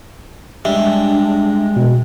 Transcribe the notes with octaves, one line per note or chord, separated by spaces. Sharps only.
G3 G#3 D4 E5
B2